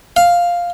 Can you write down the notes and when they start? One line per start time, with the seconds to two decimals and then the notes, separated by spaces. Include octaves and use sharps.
0.16 F5